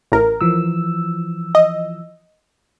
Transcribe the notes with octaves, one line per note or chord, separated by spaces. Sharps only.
A1 A#4
E3 F3 E6
D#5